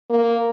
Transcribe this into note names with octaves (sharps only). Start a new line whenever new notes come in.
A#3